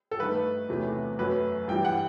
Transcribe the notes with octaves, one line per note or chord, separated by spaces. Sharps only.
A4
G2 D#3 A3 B4
E2 C3 F#3 A3
F#2 F#3 A3 B4
G2 E3 G3 G5
F#5